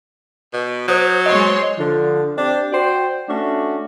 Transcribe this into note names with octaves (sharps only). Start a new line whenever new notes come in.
B2
F#3 C5 D#6 G6
G#3 C#5 D#5 C6
D3 F3
C4 D4 G4
F#4 C5 D5 G5
A3 C#4 D4 F#4